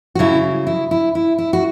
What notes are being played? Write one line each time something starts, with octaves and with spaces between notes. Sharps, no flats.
F#4
C#3 F#3 E4
E4
E4
E4
E4
F#4